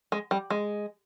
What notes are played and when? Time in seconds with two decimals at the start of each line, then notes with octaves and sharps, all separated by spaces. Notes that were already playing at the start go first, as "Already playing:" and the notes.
0.12 G#3
0.31 G3
0.50 G#3